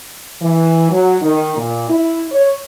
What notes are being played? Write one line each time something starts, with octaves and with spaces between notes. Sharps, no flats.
E3
F#3
D#3
A#2
E4
C#5